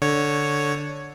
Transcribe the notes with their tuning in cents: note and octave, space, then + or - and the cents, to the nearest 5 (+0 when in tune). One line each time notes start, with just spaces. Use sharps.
D3 +0 C#5 +0